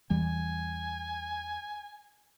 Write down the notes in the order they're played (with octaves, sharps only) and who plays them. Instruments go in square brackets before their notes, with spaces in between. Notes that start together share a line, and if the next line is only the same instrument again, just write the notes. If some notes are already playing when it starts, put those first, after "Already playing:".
[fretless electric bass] E2 E3 G3 [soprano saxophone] G#5